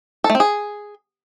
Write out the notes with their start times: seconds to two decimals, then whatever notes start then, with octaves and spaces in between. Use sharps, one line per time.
0.24 A4
0.30 A3
0.35 C4
0.40 G#4